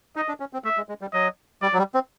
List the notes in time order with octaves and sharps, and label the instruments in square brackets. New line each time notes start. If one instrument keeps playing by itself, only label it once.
[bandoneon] D#4 [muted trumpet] D#5
[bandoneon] D4
C#4
C4
[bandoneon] A3 [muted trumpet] E5
[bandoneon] G#3
G#3
G3
[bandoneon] F#3 [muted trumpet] D#5
[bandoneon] G3 [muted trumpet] D5
[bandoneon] F#3
G3
C4